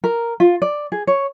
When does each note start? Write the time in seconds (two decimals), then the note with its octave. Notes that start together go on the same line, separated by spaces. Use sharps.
0.04 A#4
0.40 F4
0.62 D5
0.92 G#4
1.07 C#5